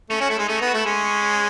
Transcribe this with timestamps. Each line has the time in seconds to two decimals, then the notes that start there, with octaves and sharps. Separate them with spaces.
0.10 A3 C#4
0.20 C#4 F#4
0.30 A3 E4
0.38 G#3 D#4
0.49 A3 C#4
0.58 B3 D#4
0.68 F#4
0.74 A3 E4
0.85 G#3 C#4